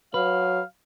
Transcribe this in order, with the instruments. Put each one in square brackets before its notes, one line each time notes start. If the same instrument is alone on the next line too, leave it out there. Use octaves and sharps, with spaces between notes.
[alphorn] F#3 [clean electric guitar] B4 [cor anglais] F5